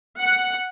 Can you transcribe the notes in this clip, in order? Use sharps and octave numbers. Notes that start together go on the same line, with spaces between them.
F#5